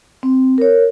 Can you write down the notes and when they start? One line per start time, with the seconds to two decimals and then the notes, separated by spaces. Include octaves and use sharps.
0.23 C4
0.58 A#4 C#5